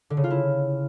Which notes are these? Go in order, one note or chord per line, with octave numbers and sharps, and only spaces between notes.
D3
C#3
F4
E4